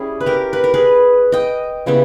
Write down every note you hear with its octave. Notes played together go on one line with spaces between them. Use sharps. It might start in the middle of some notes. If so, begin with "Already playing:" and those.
Already playing: G3 C#4 E4 G#4
B4
G4 A#4
B4
A#4
G#4 B4
D#5 G5
C#3 G3 B3 E4